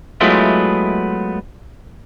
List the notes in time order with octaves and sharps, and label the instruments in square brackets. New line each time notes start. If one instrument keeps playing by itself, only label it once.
[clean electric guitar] F#3 G#3 A3 B3 E4 F4